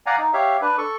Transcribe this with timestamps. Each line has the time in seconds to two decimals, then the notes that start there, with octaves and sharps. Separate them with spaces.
0.06 D5 F5 F#5 G#5 A#5
0.18 D#4
0.33 G4 C#5 E5 F5
0.62 D4 B4
0.78 A4 C#6